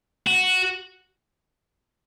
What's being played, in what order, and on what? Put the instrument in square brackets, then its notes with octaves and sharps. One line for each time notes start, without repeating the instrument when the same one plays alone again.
[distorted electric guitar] F#4